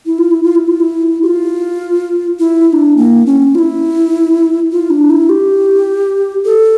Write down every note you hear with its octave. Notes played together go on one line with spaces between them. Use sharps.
E4
F4
E4
F4
E4
F4
E4
G4
F4
E4
E4
D4
A#3
C#4
F4
E4
F4
D4
E4
G4
A4